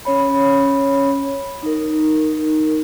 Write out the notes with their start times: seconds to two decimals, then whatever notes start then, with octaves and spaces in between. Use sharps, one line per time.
0.05 C#4 C#5 B5
1.63 D#4 A#4